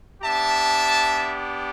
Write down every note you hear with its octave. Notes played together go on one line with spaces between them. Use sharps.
B3 D4 G4 E5 A5